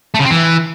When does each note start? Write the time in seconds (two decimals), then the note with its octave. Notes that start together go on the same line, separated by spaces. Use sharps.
0.14 A3
0.20 C#3
0.25 C4
0.30 E3